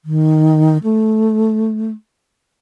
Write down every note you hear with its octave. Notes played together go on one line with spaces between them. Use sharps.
D#3
A3